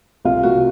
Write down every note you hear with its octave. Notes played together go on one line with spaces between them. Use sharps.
C2 F4
C2 F#4